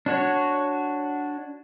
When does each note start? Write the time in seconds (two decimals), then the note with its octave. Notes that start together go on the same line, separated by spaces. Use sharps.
0.06 D4 F#4 C#5